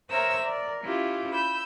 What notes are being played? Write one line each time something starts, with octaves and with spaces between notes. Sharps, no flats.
A#4 C5 C#5 E5 A#5 E6
A#4 D5
C#4 E4 F4 G4
B5 E6 G6